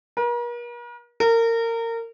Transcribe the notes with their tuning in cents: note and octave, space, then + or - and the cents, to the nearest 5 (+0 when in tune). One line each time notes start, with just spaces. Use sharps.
A#4 +45
A#4 -25